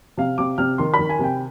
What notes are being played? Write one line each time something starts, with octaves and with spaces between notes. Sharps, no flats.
C3 F5
C3 D6
C3 F6
D#3 C6
B5
D#3
G#5
C3 G5